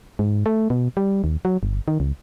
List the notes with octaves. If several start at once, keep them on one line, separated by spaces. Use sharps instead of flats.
G#2
A3
B2
G3
D#2
F#3
G1
D#3
C#2